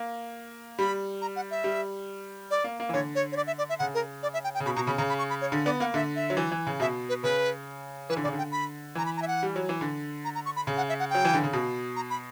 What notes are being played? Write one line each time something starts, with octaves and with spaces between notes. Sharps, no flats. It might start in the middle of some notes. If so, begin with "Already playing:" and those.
Already playing: A#3
G3 B5
A#5
F#5
E5
G3
D5
A#3
A#3
E3
D3 C#5
C#5
C#5
D5
E5
D5
E5
C#3 F#5
A#4
D5
E5
G5
G5
C#3
B2 B5
B2 A#5
C#3 B5
C#3 A#5
B5
C#6
B5
C#5
D3
B3 D5
A#3 F#5
D3 E5
E5
F#3
E3
E3
C#3
B2 E5
B4
C#3 B4
E3 B4
D3
C#3 D5
D3
G5
B5
E3 A#5
B5
A#5
E5
F#5
G3
F#3
E3
D3
A#5
A#5
C#6
B5
C#3
F#5
E5
F#5
F#3 G5
E3
D3
C#3
B2
A#5
B5